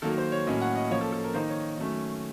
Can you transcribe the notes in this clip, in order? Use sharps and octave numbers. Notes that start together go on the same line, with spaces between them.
D#3 F#3 A#3 A4
C5
C#5
A2 F#3 A#3 C#4 D#5
F#5
D#5
F3 A#3 C#4 C#5
A4
A4
A#4
D#3 A#3 D#4 C5
C#5
D#3 F#3 A3 C#4